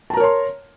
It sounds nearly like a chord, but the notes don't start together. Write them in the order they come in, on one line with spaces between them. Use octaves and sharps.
A5 A#5 A#4 C#5 C6